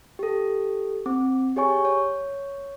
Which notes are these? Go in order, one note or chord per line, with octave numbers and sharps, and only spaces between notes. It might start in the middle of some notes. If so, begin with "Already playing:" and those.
G4 A4
C4 D6
G4 G#4 C#5 G#5 C#6
C#5